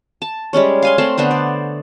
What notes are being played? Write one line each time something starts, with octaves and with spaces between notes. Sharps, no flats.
A5
G3 G#3 C#4 C#5
F5 G#5 C6
A3 C4 A5 C6
D3 A3 B3 C5
D5